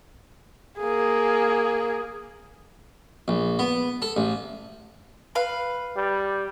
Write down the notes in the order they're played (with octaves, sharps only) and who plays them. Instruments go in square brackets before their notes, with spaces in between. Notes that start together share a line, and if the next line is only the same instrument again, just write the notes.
[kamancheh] A#3 G#4
[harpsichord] A#1
B3
A4
A1
[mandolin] B4 F5
[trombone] G3